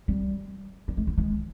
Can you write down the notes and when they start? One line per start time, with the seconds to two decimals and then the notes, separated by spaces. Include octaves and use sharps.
0.08 G3
0.88 G3
0.97 G#3
1.07 B3
1.18 G#3